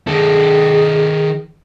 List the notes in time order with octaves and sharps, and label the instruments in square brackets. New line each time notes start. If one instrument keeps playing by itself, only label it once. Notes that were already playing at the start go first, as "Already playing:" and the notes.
[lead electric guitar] D#3 A4 [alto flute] G#4